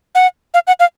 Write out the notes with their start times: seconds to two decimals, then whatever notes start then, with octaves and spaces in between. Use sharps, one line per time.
0.15 F#5
0.54 F5
0.67 F#5
0.80 F5